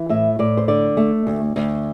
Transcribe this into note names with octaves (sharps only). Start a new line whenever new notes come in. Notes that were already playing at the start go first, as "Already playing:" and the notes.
Already playing: E3
A2 E5
A2 D5
C5
D3 D5
A3
D2
D2